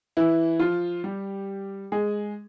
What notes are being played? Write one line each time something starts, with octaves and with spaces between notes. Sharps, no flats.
E3 E4
F3 F4
G3 G4
G#3 G#4